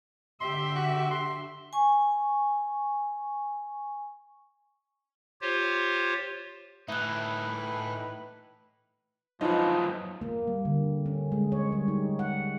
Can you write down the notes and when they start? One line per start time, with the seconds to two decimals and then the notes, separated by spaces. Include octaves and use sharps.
0.40 D3 G4 E5 C6
0.75 F#4
1.11 C6
1.73 G#5 C#6
5.41 F4 G4 C5 C#5
6.88 A2 E3 D#4 B4 E5 F#6
9.41 F#2 F3 C#4 D#4 F4 B4 D#5
10.21 A#3
10.47 G3
10.65 D3
11.06 C#4
11.32 G#3
11.52 C#5
11.72 G3
11.88 D#4
12.19 F#5